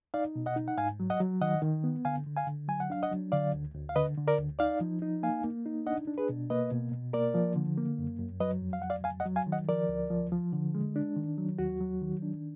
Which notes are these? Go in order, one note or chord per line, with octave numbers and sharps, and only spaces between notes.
D#4 D5 F5
B2
D#5 F#5
D#4
F#5
G#2 F5 G#5
F#3
D#5 F#5
F#3
D#3 D#5 F#5
D#3
B3
D3 F5 G#5
D3
F5 G#5
D3
F#3 G#5
F#5
D4 F5
D#5 F#5
F#3
D3 D5 F5
D2
D2
F5
D3 B4 D#5
D3
A#4 D5
D2
D#4 D5 F5
F3
D#4
A#3 F5 G#5
A#3
D#4
D4 D#5 F#5
D4
G#4 B4
B2
A#3 B4 D#5
B2
B2
A#3 A#4 D5
F3
D3
A#3
F#2
F#2
F#3 B4 D#5
F2
F5
F#3 F#5
D5 F5
F2 F5 G#5
D#5 F#5
F#3
F5 G#5
D#3
D#5 F#5
F3 A#4 D5
D2
F3
F3
D3
G#3
D4
D#3
F#3
D#2 F#4
F#3
D#3
D4